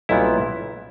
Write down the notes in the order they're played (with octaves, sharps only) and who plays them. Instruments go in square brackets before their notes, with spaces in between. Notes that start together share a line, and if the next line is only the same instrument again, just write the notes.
[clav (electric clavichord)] B1 A#2 G3 B3 E4